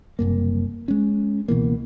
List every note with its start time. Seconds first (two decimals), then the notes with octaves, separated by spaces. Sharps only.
0.19 F#1 C2 F#2 A#3
0.88 G#3 C#4
1.48 C#2 B2 E3 A#3